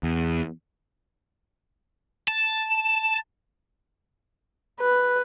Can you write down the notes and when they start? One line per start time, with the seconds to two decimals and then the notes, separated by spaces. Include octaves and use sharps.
0.03 E2
2.28 A5
4.80 B4